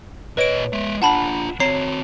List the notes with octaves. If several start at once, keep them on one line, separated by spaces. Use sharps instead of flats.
A#2 B4 C#5 D#5 D7
G#3 E5
D4 F4 F#5 A5 B5
C4 F#4 C#5 A#5 C7